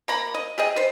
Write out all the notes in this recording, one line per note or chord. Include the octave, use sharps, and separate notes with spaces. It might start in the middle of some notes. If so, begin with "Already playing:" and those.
A#3 A#5 B5
D#5
G4 G#4 D#5
B4 C5